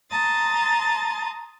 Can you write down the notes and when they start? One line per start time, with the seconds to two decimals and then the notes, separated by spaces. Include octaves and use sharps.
0.11 A5 A#5 C6 D#6 A6